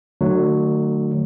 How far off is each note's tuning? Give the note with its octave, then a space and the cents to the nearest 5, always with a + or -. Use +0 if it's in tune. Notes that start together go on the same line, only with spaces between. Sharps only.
D3 +40 F#3 +0 A3 +5